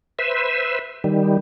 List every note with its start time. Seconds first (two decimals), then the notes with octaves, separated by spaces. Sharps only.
0.19 B4 C5 E5
1.04 D#3 G3